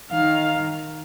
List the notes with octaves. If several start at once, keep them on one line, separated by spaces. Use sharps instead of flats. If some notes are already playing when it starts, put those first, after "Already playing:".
D#3 F5